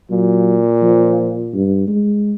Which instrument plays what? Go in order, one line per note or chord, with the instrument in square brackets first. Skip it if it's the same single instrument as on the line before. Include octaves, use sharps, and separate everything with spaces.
[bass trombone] A#2 [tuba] F#3
[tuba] F3
G2
G#3